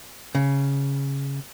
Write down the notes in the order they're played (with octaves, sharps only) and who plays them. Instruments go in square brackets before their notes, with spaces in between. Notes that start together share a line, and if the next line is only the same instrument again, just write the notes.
[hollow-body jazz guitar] C#3